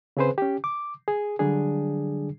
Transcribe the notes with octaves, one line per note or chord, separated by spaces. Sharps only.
C#3 C4 G#4 B4 C5
C#4 G4
D6
G#4
D3 F#3 G3 D4 G#4